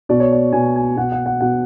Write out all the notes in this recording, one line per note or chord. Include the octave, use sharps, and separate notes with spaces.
B2 D5
C#5
D5
B2 G#5
G#5
B2 F#5
F#5
F#5
B2 F#5